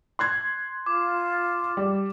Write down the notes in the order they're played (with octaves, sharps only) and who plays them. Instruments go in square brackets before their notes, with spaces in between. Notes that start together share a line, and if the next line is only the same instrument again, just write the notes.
[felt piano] C6 F#6 G#6
[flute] F4 [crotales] D6
[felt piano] G3